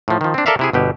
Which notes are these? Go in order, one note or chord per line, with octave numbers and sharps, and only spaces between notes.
A2 F3
D#3 F3
C4 D4
A4 A#4 D5 E5 F5
C3 E4 G#4
G1 B2 G4